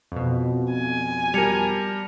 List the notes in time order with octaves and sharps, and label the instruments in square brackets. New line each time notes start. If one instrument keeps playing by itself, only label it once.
[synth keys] F2 B2
[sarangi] G#5
[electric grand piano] G3 A#4 [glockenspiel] A5 C#7 F7